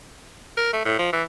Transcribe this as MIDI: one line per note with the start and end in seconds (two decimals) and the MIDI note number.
0.57 0.71 70
0.73 0.80 57
0.85 0.98 45
0.99 1.09 53
1.13 1.23 52